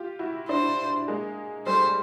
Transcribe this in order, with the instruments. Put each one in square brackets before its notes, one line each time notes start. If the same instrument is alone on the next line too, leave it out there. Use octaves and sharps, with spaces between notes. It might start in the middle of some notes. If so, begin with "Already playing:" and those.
Already playing: [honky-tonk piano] F4 G4
E4 F#4
[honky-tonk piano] D4 E4 [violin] C5
[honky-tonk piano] G#3 A#3
[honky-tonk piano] G3 A3 [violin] C5